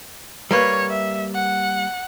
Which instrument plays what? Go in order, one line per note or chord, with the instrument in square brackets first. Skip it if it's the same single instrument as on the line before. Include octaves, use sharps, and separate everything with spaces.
[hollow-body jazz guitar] G3 A#3 B4 [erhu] C#5
[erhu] E5
F#5